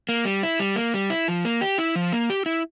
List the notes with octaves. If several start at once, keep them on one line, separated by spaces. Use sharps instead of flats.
A#3
G3
E4
G3
A#3
G3
E4
F3
A#3
G4
E4
F3
A#3
G4
E4